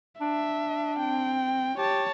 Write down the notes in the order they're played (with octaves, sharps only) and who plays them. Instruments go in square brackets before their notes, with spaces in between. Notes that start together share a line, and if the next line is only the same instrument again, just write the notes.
[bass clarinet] D4 [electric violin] E5
[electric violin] C4 G5
[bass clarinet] G4 [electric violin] C#5 A5